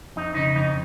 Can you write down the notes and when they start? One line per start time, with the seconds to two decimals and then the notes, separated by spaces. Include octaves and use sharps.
0.16 F2 D#4
0.35 C#3 D#4
0.55 F2 D#4